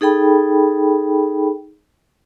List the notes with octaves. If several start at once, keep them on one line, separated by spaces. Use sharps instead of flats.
D#4 G#4 A4 G5 B5